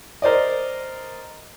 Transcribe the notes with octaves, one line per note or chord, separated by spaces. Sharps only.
A#4 C5 D5 D#5